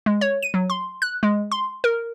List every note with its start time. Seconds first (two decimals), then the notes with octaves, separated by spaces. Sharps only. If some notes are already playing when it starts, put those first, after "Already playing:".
0.06 G#3
0.21 C#5
0.43 D#7
0.54 F#3
0.70 C6
1.02 F#6
1.23 G#3
1.52 C6
1.84 A#4